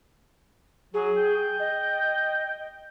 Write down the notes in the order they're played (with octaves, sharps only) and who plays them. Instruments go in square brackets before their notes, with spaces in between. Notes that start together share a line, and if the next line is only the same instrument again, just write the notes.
[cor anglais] F#3 [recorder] G#4
[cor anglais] G5
[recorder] D#5